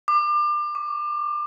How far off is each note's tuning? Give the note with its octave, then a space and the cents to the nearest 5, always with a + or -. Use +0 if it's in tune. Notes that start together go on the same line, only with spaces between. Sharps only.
D6 +30
D6 -35